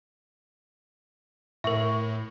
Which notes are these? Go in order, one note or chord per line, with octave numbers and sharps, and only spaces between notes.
A2 A#4 E5 C#6